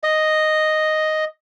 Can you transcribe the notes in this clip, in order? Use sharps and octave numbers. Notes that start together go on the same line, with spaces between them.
D#5